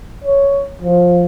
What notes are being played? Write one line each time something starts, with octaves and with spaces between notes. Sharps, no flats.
C#5
F3